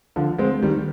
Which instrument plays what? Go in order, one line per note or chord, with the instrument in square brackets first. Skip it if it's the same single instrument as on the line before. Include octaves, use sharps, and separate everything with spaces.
[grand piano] D3 F3
G#3 C4
D#3 G3